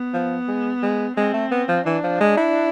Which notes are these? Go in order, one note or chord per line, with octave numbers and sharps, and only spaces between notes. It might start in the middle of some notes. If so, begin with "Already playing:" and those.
Already playing: B3
F3
G#3
G#3
G#3 C4
A3
B3
F3
E3 D4
F3
G#3
E4